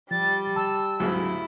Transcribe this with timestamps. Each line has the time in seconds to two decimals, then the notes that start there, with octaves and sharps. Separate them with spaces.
0.11 F3 G3 A6
0.56 A5 E6
1.00 D2 G#2 C#3 F#3 E4